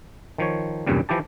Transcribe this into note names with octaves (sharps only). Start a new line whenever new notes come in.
D#3 F3 C#5
B1 E2 G2 A#2 C#3 G3
E3 F3 E4 G4 A5